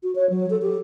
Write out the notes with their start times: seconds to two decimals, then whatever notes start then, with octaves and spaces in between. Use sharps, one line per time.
0.03 F#4
0.15 C#5
0.30 F#3
0.50 A4
0.62 G4